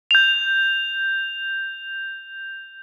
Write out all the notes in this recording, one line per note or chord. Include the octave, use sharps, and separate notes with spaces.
G6 F7